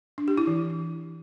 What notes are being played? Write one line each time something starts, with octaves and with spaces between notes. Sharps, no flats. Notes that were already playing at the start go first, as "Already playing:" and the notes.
D4
G4
E4
E3